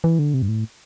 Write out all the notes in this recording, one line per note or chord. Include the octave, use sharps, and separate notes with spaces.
E3
D3
C3
G2
A2